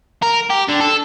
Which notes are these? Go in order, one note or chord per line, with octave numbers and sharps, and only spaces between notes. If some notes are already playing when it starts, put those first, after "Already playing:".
A#4
G4
D3
A4